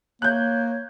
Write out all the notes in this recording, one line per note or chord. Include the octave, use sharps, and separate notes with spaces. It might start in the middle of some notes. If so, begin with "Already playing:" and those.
A#3 C#5 F#6 G6